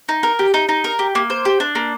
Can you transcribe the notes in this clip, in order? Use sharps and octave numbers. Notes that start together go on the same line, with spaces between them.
D#4
A#4
G4
D#4
D#4
A#4
G4
A#3
C5
G4
D4
A#3